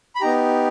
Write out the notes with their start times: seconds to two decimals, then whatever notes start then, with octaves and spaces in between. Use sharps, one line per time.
0.15 B5
0.21 B3 D#4 G4 A#5